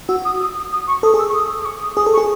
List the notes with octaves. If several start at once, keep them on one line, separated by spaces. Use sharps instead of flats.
F#4 E6
D#6
D#6
D#6
D#6
C#6
A4 D#6
G#4
E6
C#6
D#6
D#6
C#6
D#6
G#4 D#6
A4
C#6
G#4